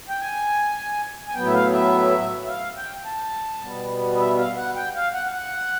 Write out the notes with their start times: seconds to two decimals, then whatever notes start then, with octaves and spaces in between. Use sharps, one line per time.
0.09 G5
0.21 G#5
1.28 G#5
1.34 A2 F#3 B3 G5
1.46 E5
1.53 F5
1.72 E5
2.44 E5
2.48 F5
2.77 G5
3.05 A5
3.62 B2 G3 B3
4.14 D#5
4.19 E5
4.38 F5
4.57 F#5
4.76 G5
4.95 F5
5.14 F#5
5.33 F#5